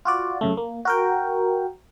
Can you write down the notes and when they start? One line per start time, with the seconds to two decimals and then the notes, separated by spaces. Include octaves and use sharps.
0.05 F4 F#4 D5
0.41 F#2 C#3 A3
0.57 A#3
0.85 F#4 A#4 G5